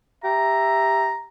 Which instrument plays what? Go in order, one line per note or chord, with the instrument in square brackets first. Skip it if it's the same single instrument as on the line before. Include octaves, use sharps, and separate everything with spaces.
[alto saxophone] G4 [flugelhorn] E5 [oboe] A#5